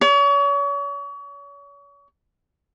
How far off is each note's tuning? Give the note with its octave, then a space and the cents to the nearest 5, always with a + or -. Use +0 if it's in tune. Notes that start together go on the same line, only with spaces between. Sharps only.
C#5 +35